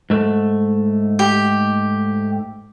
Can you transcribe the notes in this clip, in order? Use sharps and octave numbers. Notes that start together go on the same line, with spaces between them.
G#2 A3
G4